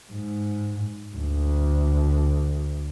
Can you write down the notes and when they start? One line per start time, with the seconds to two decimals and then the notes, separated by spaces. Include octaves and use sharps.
0.11 G#2
1.16 D2